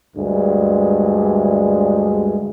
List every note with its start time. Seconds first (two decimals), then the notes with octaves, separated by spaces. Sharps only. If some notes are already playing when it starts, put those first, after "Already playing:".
0.16 D2 G2 G#3